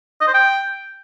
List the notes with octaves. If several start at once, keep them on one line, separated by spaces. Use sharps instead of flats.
D#5
C5
G5